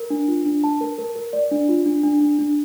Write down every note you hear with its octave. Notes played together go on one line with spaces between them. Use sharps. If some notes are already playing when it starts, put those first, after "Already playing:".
Already playing: A#4
D4
F4
D4
A5
A#4
A#4
A#4
D5
D4
F4
D4
D4
D4
D4